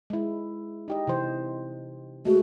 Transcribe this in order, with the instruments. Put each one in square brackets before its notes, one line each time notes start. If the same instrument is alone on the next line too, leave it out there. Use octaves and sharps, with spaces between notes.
[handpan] G#3 E4
D#4 G4 D#5
C3 E3 C5
[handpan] G#3 A3 G#4 [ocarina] F#4